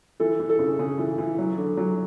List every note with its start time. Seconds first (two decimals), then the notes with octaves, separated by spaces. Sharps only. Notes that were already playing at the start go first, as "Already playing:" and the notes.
0.20 E3 A4
0.40 E3
0.49 A4
0.59 C#3
0.79 C#3 G#4
0.99 E3
1.18 E3
1.38 F#3
1.58 D3
1.77 F#3